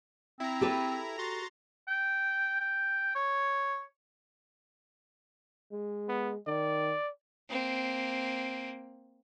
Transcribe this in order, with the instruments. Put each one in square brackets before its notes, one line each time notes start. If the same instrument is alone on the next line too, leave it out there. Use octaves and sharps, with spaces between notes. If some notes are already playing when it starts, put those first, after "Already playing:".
[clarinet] C4 [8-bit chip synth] E4 A#5
[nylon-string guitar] G4 A4 B4
[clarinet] F#4 [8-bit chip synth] A#5 C6 A6
[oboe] G5
G5
C#5
[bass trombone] G#3
[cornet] B3
[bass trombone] D#3 [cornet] D5
[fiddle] A#3 C4